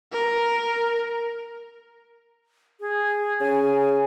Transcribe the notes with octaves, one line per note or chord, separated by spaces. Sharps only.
A#4
G#4
C#3 G#5